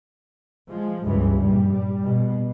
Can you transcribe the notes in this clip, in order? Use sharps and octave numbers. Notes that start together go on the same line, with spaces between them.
F3 G#3
F#1 C#2 G2 E3
A#1 G2 G3
G3
B2